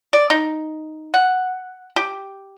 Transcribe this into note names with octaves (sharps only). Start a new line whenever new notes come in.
D5
D#4
F#5
G4